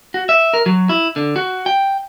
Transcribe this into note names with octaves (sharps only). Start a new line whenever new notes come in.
F#4
E5
A#4
F#3
E4
D3
F#4
G5